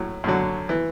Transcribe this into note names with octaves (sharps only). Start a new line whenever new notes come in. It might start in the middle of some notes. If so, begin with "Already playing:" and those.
Already playing: A2 F#3
F#2 D3 F#3
E3